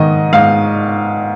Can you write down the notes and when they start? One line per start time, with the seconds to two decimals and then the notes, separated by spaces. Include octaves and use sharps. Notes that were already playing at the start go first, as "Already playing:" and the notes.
Already playing: G#2 D#3 D#5
0.33 G#2 F5